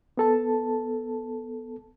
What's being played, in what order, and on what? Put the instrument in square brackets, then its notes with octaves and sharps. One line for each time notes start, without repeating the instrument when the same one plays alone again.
[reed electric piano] B3 A4 A5